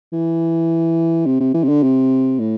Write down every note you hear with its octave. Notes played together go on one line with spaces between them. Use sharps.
E3
C3
C3
E3
C3
D3
C3
A2